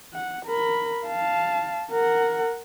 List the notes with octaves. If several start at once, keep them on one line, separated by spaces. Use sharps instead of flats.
F#5
A#4 B5
F5 A5
A#4 F#5